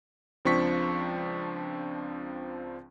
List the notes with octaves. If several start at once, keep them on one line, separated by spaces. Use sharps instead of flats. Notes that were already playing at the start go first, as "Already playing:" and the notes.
C#2 F3 C4 D4 C#6 B6